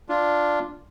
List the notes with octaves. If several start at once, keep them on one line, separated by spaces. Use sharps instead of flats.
D4 F4